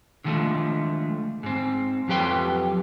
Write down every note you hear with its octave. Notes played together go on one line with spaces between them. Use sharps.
D3 D#3 F3 G#3 A3
G#2 C4
F2 F#3 G4 B4 G5 C6